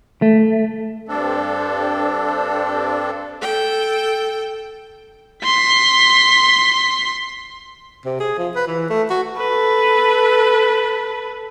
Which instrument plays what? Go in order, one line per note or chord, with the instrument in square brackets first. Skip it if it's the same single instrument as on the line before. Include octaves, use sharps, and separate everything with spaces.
[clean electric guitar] A3
[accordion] G2 C4 D4 A4
[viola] A4 G5
[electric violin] C6 B6
[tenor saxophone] C3
G#4
F3
B4
E3
A3
F#4
[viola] A4 B4